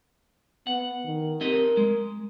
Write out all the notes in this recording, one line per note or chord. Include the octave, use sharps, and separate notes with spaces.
B3 F#5
D#3
C4 G4 A#4 D#5
G#3